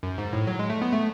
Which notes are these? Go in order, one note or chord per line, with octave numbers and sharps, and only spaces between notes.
F#2
G#2
A2
F#3
G#3
A3
B3
A3